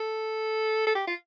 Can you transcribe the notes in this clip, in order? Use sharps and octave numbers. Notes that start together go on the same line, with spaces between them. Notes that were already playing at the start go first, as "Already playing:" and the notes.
Already playing: A4
A4
G4
F4